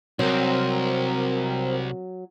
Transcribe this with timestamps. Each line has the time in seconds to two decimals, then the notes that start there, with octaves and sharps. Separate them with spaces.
0.19 C2 F#3 C4 A#4